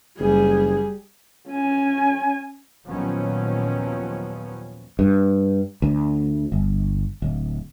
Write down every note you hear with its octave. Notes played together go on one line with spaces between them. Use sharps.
F#1 G3 G#4
C#4 G#5
D#2 A#2 F3 F#3 B3 C#4
G2
D2
G1
D1